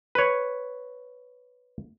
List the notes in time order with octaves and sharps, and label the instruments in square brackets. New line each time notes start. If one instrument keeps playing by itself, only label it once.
[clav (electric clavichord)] B4 C#5